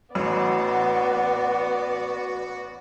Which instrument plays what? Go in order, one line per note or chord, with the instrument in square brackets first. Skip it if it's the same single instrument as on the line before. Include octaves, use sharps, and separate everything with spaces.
[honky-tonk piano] A1 [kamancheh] B3 D5 [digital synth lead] F#4 [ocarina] F#5